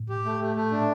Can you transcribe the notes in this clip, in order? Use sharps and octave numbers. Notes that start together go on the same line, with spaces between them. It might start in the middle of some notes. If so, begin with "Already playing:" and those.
Already playing: A2
G4
A3
A3
A3
A#2 D4